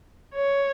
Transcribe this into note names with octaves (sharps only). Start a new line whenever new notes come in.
C#5